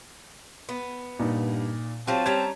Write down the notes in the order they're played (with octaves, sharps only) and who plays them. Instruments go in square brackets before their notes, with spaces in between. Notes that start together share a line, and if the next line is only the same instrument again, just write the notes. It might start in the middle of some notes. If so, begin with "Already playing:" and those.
[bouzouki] B3
[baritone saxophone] G2 [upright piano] A#2 D#4
[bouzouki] F#3 F4 G4 [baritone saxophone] C4 [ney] A5
[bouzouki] G3 C#4 A#5 [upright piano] G#6 B6